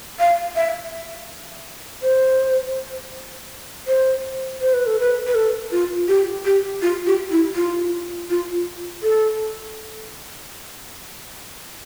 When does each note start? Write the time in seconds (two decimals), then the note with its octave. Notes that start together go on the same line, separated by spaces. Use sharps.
0.19 F5
0.56 E5
2.03 C5
3.88 C5
4.61 C5
4.74 B4
4.86 A4
5.00 B4
5.27 B4
5.35 A4
5.72 F4
6.08 G4
6.45 G4
6.82 F4
7.07 G4
7.31 E4
7.55 F4
8.30 F4
9.03 A4